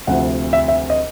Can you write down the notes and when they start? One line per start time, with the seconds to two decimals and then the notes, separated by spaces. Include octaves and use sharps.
0.07 D2 C3 F3 F#5
0.53 E5
0.68 E5
0.90 D#5